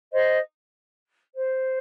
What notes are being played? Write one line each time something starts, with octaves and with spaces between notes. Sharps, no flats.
C5 D#5
C5